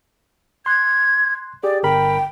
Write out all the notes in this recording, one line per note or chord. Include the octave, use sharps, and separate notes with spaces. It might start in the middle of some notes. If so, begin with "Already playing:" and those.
C6 F#6 G#6
G4 G#4 D5
G1 A#4 G5 B5